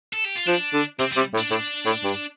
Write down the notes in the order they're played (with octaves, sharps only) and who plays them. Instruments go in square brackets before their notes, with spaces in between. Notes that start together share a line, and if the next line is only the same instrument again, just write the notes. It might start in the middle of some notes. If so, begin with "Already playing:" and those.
[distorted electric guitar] A4
G4
F4
[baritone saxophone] F3 [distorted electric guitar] D4
[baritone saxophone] D3
[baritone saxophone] C3 [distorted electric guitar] C4
[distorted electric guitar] G3
[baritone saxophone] C3
A2
[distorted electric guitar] D4
[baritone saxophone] A2 [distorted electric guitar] D4
[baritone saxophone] A2
G2